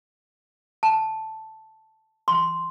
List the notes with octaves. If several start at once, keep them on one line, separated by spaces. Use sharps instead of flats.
A5
C6